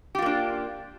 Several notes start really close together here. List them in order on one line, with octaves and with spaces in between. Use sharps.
G4 F4 A#3 D4